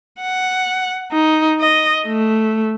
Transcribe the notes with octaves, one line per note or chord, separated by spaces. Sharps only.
F#5
D#4
D#5
A3